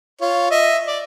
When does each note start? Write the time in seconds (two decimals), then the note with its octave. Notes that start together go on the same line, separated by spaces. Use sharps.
0.21 F4 C#5
0.51 D#5 E5
0.87 D5